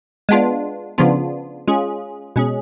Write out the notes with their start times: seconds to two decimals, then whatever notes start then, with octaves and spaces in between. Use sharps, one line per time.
0.29 G#3 B3 D4 F4
0.98 C#3 F3 B3 D4 F4
1.67 G#3 C#4 F4 G#4
2.36 B2 G#3 C#4 G#4